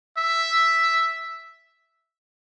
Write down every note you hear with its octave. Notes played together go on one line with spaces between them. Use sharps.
E5